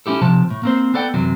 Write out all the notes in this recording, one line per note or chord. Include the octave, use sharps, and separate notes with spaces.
C#4 D#4 E4 G4 A4
C3 F3 G4 A5
A2
A#3 C4 C5
B3 A4 D5 F#5 G5
F#2 C3 E3 F#3